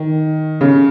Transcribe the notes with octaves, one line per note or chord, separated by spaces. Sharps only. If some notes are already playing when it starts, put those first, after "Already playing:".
Already playing: D#3
C#3